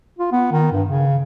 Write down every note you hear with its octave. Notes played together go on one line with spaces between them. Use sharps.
F4
B3
D#3
G2
C#3